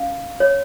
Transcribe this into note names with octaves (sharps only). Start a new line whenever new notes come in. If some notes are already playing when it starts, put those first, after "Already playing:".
Already playing: C#4 F5
C#5